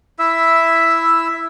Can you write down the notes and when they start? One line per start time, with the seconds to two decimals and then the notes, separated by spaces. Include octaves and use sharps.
0.19 E4 E5 E6